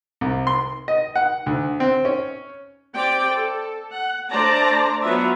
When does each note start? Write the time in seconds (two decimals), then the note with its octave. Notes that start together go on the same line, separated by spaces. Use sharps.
0.21 C2
0.47 C6
0.88 D#5
1.16 F#5
1.46 D2
1.80 C4
2.05 C#4
2.94 C4 G4 D5 G5
3.35 A4
3.92 F#5
4.30 A3 D4 C5 D5 A5 A#5
5.02 F#3 B3 F4 E5